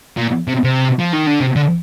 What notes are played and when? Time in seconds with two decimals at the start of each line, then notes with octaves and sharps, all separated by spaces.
0.17 A#2
0.48 C3
0.64 C3
0.99 F3
1.13 D#3
1.27 D3
1.40 C3
1.56 D3